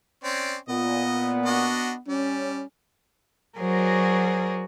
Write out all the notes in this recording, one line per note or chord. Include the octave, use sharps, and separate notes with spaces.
C4 C#4 D5
A#2 B3 D#5
D4 F#4 D#5
G3 C#4
F#3 F#4 G#4 A#4 C5 D5